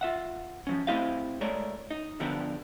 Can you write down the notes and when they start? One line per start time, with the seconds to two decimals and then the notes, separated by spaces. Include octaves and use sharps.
0.01 F4 E5 F#5
0.67 F3 F#3 C#4
0.87 A3 C4 E4 G4 D#5 F5
1.41 G#3 A3 A#4 C#5 D5
1.91 D#4
2.20 D3 F3 B3 D4 G4 A#4